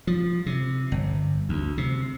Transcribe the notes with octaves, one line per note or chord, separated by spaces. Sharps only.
F3
C3
G1
D2
C3